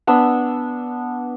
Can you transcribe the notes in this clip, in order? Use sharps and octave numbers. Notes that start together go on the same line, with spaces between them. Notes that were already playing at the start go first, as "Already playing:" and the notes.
B3 D4 E6